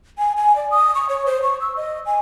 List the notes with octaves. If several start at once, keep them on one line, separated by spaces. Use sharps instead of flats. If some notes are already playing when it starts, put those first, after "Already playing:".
G#5
G#5
D5
D#6
C#6
C#5
C5
C#6
E6
D#5
G#5